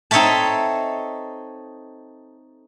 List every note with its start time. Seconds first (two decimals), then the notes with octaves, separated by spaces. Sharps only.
0.11 C4 D#4 A4 C#5 E5 A5